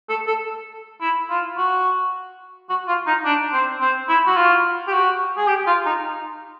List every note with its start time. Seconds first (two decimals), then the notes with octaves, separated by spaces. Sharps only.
0.09 A4
0.27 A4
1.01 E4
1.30 F4
1.58 F#4
2.70 F#4
2.88 F4
3.07 D#4
3.25 D4
3.53 C4
3.81 C4
4.09 E4
4.26 F#4
4.36 F4
4.87 G4
4.93 F#4
5.37 G#4
5.48 G4
5.67 F4
5.86 D#4